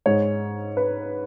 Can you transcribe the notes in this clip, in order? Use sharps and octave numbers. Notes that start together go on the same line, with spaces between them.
G#2 G#3 C#5
B4